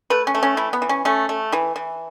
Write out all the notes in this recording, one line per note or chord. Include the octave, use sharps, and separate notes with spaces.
A3 B4
C#4
A3
C#4
E3 E4
B3
E3
C#4
A3 C#4
A3
E3 E4
E3